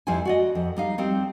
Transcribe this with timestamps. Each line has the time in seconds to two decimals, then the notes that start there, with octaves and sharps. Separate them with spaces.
0.07 F2 F3 G3 E4 G#5
0.25 F#4 D5 D#5
0.55 F2
0.77 G3 D#4 F5
0.98 G3 C4 D#4